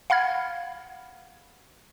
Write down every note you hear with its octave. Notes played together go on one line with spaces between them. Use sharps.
F5 F#5 B5 F6 G#6